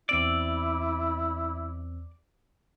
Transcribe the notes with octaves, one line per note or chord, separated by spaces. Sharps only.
E2 C4 E4 D5 E6